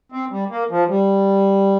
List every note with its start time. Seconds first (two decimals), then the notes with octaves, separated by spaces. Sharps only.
0.12 C4
0.31 G3
0.50 A#3
0.71 F3
0.89 G3